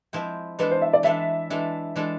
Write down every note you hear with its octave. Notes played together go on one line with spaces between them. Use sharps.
F3 G#3 C4 E4
E3 G#3 D4 A4 B4
C5
E5
D5
E3 G#3 D4 A4 E5
E3 G#3 D4 A4
E3 G#3 D4 A4